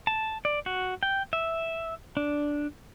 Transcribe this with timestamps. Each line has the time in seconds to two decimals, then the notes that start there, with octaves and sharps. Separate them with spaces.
0.07 A5
0.45 D5
0.66 F#4
1.03 G5
1.33 E5
2.17 D4